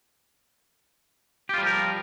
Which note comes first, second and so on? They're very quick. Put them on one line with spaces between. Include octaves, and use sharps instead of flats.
G4 F4 G3 F3 A#4